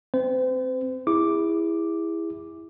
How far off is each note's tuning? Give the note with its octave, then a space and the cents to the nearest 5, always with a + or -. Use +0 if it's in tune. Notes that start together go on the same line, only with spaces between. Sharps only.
C4 +0 C5 -40
E4 +0 G#4 -25 D6 +0